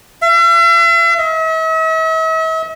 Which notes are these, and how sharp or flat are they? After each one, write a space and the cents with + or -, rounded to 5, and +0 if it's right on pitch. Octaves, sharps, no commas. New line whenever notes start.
E5 +45
E5 -45